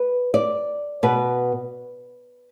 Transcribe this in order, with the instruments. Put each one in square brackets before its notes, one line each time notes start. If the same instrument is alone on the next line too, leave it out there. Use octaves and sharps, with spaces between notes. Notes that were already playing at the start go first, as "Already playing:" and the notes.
Already playing: [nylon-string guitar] B4
D5
B2 B4